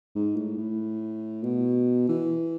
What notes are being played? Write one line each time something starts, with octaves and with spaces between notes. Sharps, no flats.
G#2
A2
A2
B2
E3